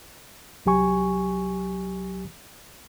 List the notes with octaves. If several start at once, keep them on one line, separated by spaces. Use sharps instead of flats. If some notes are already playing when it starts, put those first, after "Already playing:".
C2 F#3 G4 G#5 C#6